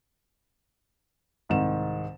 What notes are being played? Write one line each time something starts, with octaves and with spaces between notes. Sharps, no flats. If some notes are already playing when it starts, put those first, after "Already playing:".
C2 G#2 D#3 E7